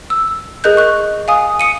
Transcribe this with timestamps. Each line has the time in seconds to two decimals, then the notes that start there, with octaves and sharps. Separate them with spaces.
0.10 E6
0.64 G#4 A#4 D#5 F#6 G6
0.77 C#6 F#6
1.28 F5 G#5 D#6
1.60 D#6 C#7 D#7